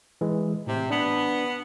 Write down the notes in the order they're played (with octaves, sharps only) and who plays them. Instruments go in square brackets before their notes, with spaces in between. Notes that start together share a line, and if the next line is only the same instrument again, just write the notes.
[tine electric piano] E3 G#3
[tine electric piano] A2 [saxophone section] C3
[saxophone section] B3 [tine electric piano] D4